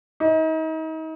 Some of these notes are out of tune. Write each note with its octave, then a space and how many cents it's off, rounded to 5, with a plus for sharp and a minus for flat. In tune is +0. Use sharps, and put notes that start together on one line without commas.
D#4 +35